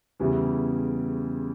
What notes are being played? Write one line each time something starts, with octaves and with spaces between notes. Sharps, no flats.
E2 C#3 E3 G3